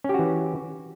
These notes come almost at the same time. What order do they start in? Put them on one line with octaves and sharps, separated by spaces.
C#4 G4 F#4 E3